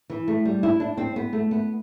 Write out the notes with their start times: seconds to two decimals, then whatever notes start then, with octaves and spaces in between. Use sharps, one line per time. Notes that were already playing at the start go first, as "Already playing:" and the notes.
0.10 E3
0.28 A3
0.45 G3
0.63 E4
0.80 D4
0.97 C4
1.16 B3
1.33 A3
1.51 B3